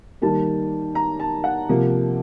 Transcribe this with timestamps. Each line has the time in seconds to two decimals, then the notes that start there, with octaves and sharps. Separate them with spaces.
0.22 D#3 G3 A#3 A5
0.95 A#5
1.20 A5
1.44 F#5
1.69 C3 F3 A#3